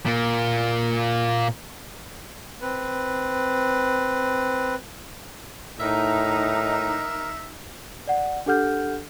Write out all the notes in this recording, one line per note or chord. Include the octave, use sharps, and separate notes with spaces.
A#2 A#3
C4 B4
A2 D#4 A#4 E5
D5 F#5
D4 G4 A4 F#5 F6 G6